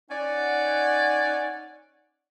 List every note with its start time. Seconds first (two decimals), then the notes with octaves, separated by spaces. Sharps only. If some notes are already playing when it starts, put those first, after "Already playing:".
0.11 C#4 D#4 D5 F#5